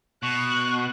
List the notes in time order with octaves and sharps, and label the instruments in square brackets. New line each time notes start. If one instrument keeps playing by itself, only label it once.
[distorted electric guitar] B2 [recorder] C#6 [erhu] F#6